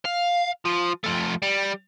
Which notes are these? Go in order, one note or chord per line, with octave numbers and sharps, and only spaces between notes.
F5
F3
F3 A3
G3